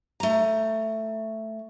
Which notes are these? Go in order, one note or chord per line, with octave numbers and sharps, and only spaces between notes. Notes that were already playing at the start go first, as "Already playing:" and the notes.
A3 A#5